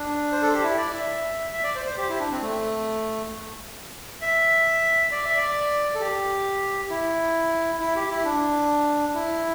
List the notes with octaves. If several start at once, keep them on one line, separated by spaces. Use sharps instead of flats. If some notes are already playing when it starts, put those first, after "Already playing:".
Already playing: D4
C5
A4
G4
E4
D5
E5
E5
D5
C5
C5
G4
E4
D4
C4
A3
E5
D5
E5
D5
A4
G4
E4
E4
G4
E4
D4
E4